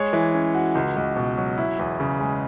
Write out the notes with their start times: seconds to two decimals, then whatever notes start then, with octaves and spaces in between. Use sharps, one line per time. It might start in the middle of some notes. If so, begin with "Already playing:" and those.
Already playing: G#3 C#5
0.13 E3
0.34 C#4
0.55 F#4
0.75 C#2
0.96 C#2
1.16 B2
1.37 F#3
1.58 E4
1.79 E2
2.00 C#3
2.20 G#3